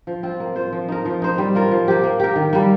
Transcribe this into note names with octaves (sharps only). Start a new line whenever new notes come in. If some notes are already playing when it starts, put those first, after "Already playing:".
F3
C4 F4
A#3
F4 C5
F3
D#4 A#4
F3
D#4 C5
G3
A#3 F4 A#4
F3
A#3 G4
A#3
G4 A#4
D#3
G3 A#3